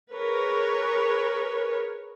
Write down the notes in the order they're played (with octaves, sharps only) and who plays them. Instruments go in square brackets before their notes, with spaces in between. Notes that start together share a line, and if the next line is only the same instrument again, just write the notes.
[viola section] G#4 A#4 B4 C#5